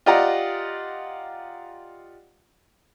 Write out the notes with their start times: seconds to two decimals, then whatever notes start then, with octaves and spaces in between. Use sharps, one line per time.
0.06 F4 G4 D5 D#5 F#5 A#5